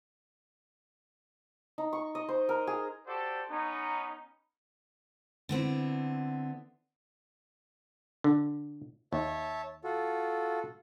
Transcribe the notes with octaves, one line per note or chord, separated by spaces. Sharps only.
D#4
C#6
D#5
C5
A#4
G#4
F#4 G4 A4 C5 D5
B3 C#4 D#4
D3 B3 C4 E4
D3
D#2 C#5 E5 A5
F4 F#4 A4